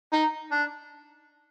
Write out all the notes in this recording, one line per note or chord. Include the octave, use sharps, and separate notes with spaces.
D#4
D4